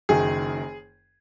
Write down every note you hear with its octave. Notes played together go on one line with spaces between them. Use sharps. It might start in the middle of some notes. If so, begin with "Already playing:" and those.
F#1 F#2 D#3 G#4